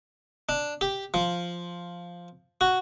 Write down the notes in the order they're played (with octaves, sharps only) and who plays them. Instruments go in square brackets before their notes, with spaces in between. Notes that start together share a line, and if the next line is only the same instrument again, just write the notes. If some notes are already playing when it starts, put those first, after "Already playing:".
[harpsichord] D4
G4
F3
F#4